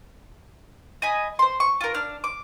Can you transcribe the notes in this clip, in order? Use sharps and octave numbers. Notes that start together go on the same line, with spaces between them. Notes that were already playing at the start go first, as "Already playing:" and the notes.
D#5 G#5 B5
C5 C6
C#6
F4 A#4
D4 F6
D6